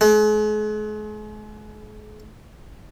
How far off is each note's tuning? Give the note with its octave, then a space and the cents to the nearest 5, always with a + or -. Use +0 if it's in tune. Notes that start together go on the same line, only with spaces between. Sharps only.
G#3 +40